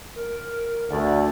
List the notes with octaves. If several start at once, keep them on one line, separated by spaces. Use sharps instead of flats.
A#4
D2 D5